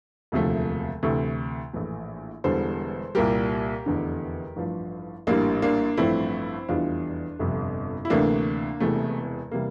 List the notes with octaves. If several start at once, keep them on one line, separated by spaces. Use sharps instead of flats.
E1 D2 C3 F3 A3
D2 C3 E3 A3
A#1 A2 E3 A3
E1 E2 D3 G3 A4 C5
C2 A#2 G3 G4 A#4
F1 E2 D3
A1 G2 F3
A#1 A2 G3 A#3 D4
A#3 D4
A1 G2 F3 A3 C4 E4
F1 E2 E3 G3 D4 F4
G1 F2 C3
E4
D2 C3 E3 A3 A#3 D4
E1 E2 C3 E3 A3
C3 E3 G3 A#3